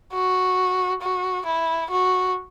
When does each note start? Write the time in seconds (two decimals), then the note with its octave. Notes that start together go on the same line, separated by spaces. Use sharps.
0.13 F#4
1.02 F#4
1.46 E4
1.91 F#4